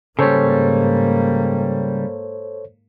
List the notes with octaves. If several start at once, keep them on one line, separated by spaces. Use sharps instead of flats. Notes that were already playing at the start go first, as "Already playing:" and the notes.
G#2 C#3 G3 A#3 A4 C5 C#5